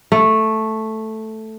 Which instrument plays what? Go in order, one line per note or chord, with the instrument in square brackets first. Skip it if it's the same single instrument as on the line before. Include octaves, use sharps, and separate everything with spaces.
[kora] A3